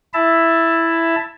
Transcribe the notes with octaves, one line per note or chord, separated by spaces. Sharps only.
E4 E5 A5